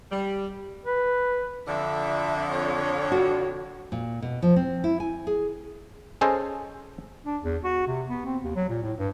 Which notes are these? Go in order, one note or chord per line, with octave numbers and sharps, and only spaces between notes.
G3
B4
F2 D3 E5
C#5
F#4
A#2
B2
F3
C4
E4
G#5
G#4
C#4 G#4 A4 C5 D#5
D4
E2
F#4
C3
B3
C4
D#2
F#3
A#2
A2
G2